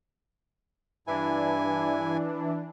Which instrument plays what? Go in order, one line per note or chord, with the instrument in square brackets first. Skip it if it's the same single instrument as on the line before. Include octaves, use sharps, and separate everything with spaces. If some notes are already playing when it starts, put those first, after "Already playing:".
[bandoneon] G2 E4 G#5 [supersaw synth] E3 D4